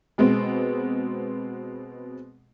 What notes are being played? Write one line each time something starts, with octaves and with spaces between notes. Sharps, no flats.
B2 G#3 B3 C4